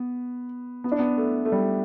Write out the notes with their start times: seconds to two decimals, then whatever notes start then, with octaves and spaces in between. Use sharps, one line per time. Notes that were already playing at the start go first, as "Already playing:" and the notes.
Already playing: B3
0.84 B3
0.92 D4
0.99 B3
1.18 A3
1.45 A3
1.52 G3